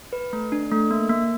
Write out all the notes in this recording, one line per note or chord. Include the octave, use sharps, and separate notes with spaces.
B4
A3
D4
A3
A#3
A#3